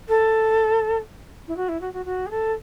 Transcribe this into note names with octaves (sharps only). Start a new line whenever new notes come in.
A4
E4
F#4
E4
F#4
F#4
F#4
G#4
A4